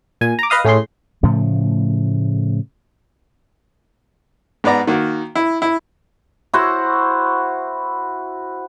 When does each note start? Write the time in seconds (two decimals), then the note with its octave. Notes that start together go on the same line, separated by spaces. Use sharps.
0.21 A#2 G#5
0.39 A#5 D6
0.50 B4 D#5 F5 D#6
0.65 A2 C#4 G#4 C6
1.23 A2 C#3 F3 A3
4.64 G#2 B3 B4 D5 A#5
4.87 D#3 A#3 F#4
5.36 E4
5.62 E4
6.54 E4 F#4 C5 F#5